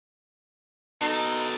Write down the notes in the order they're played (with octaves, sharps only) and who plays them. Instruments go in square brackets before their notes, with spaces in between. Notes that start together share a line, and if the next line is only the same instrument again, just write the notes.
[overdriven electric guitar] B2 A4 [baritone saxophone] D#4